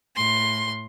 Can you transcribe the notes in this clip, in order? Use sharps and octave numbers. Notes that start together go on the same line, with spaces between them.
A2 C6